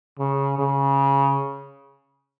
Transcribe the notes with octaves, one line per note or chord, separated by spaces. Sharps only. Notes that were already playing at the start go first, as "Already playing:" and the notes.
C#3
C#3